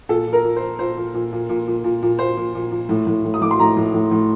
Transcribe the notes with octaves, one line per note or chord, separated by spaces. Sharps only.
A#2 A4
A#2
A#4
A#2
C5
A#2
A#2 C5
A#2
A#2
A#2
A#2
A#2
A#2
A#2
A#2 C5
A#2
A#2
A#2
A2
A2
A2
D#6
A2 D6
C6
A2 A#5
A2
A2
A2